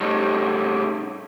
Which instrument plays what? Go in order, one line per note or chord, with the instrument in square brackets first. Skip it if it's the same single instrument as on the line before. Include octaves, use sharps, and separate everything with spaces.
[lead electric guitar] A2 G3